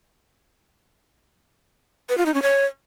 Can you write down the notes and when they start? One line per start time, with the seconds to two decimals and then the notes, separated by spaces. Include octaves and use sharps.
2.09 B4
2.18 F4
2.26 D#4
2.34 C#4
2.42 C#5